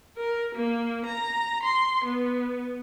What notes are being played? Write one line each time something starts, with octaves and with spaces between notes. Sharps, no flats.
A#4
A#3
A#5
C6
B3